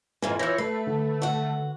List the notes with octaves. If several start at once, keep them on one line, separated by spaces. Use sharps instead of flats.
F2 G#2 E3 A#3 G#5
E3 F3 C#5 E6 G6 A#6
A3 B4 C7
D3
F#4 F#5